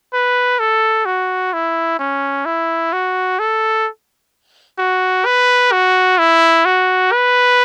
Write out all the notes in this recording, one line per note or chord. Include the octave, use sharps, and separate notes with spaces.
B4
A4
F#4
E4
C#4
E4
F#4
A4
F#4
B4
F#4
E4
F#4
B4